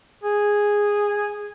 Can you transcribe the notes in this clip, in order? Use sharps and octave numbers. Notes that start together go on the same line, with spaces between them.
G#4